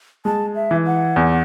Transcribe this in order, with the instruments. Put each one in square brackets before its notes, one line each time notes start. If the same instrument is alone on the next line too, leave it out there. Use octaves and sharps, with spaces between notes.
[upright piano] G#3 [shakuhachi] A5
[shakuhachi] E5
[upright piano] E3
[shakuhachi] F#5
[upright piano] E2